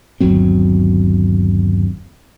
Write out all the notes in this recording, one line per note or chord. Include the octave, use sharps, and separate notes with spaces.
G1 D#2 F#3 C4